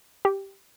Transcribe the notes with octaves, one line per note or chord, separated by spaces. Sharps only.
G4